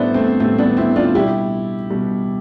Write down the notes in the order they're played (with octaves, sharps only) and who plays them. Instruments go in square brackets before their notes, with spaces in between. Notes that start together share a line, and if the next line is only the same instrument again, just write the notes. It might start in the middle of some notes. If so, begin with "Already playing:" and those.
Already playing: [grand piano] A2 G3 B3 D4 E4 A4 C5
A3 C4
A2 G3 A3 C4
B3 D4
C4 E4
D4 F4
B2 G3 E4 G4
B2 G3